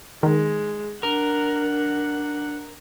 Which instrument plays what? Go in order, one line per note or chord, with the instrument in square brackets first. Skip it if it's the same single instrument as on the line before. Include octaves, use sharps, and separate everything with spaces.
[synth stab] D#3 [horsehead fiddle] G#3
[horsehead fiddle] D4 F#5 [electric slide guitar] A#4